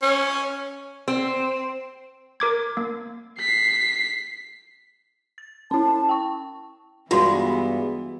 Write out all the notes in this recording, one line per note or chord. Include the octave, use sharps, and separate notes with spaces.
C#4
C4
A#4 D6 G#6
A#3
B6 C7
A6
C#4 E4 A5
G5 C#6
G2 E3 G#3 B3 F4 F#4